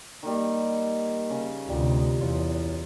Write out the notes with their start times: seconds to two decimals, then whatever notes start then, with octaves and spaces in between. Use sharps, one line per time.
0.23 D#3 G3 A#3 A#4 D#5
1.30 C#3
1.69 D2 C3 G3 F4 G4 A#4
2.21 E2 E4 F4 C#5